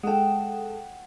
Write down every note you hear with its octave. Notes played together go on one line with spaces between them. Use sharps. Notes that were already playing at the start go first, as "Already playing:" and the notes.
G#3 A4 F#5 G5